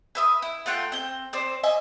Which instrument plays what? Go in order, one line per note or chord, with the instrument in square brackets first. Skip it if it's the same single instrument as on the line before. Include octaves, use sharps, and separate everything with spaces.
[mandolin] B4 E5 D#6
E4
A3 F4 F#5 G5
C4 G6
C4 C5 D5
D#5 E5 G#5